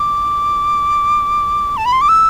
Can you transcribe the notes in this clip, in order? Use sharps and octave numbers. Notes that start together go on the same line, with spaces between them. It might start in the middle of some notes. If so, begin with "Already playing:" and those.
Already playing: D6
A5
B5
C6
D6
E6